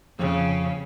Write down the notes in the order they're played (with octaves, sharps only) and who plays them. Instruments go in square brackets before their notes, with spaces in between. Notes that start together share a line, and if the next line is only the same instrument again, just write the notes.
[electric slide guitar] F2 [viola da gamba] C#3